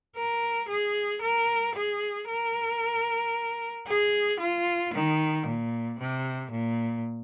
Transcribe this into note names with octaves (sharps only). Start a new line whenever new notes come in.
A#4
G#4
A#4
G#4
A#4
G#4
F4
D#3
A#2
C3
A#2